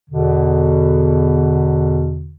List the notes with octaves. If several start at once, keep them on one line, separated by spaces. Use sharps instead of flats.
E2 B2 D3